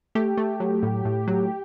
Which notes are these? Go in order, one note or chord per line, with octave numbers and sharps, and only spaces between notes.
A3 G4
A3
F#3
A2
A2
F#3